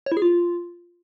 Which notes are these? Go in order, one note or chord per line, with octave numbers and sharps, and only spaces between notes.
C#5
E4
G#4
F4